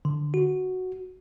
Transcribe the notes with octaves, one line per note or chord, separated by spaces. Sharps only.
D3
F#4